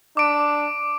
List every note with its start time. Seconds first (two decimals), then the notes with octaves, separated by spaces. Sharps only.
0.17 D4 D6 D7